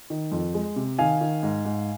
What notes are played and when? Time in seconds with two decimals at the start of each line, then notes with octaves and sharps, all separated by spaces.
0.10 D#3
0.32 F2
0.54 G#3
0.76 C3
0.99 D#3 F5 G#5
1.21 D#3
1.43 G#2
1.65 G#2